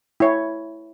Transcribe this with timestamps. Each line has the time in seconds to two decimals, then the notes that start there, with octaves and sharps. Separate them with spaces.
0.20 E4 C#5